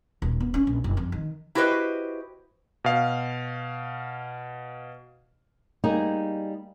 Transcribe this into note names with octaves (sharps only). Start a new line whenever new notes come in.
D#1
B3
C#4
A#1
F#1
F2
D#3
E4 F#4 G4 B4 C5 D#5
B2 F5
G3 A#3 D#4 G#4